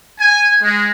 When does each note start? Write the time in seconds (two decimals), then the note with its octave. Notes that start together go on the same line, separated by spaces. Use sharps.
0.19 G#5
0.62 G#3